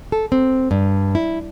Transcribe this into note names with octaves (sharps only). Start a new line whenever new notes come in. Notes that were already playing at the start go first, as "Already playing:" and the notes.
A4
C4
G2
E4